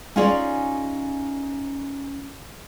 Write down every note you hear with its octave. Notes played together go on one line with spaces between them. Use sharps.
C#4 D#4 F4 G#4 C#5 D5